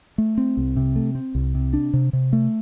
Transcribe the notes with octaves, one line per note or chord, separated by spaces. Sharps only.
A3
C4
C2
C3
A3
C4
C2
C3
D4
C3
C3
A3